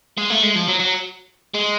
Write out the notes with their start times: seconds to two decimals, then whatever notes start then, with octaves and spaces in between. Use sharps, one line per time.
0.17 G#3
0.30 A3
0.43 G#3
0.55 F3
0.68 F#3
0.79 F#3
1.54 G#3